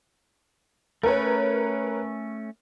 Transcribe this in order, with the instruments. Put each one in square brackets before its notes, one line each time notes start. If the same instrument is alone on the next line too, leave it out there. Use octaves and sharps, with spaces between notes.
[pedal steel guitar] A3 C#4 [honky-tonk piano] A#4 B4 C#5